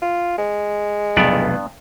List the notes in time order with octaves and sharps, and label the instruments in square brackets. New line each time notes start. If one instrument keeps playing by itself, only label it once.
[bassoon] F4
G#3
[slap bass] F1 B1 E2 [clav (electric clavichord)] G2 B3 D5